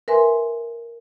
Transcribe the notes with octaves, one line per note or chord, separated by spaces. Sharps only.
A#4 B4 E5 G#5 C6